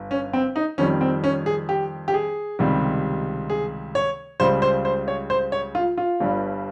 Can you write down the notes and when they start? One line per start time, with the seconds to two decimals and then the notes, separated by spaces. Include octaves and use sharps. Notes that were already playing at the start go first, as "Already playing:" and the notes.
Already playing: G1
0.11 C#4
0.33 C4
0.56 D#4
0.78 F2 D#3 G3 C#4
1.01 C4
1.24 C#4
1.46 G#4
1.69 G4
2.08 G4
2.14 G#4
2.59 C#2 C3 D#3 G3
3.50 G#4
3.95 C#5
4.40 C#2 C#3 G3 C5
4.62 C5
4.85 C5
5.08 C#5
5.30 C5
5.52 C#5
5.75 F4
5.97 F4
6.20 G1 G2 G3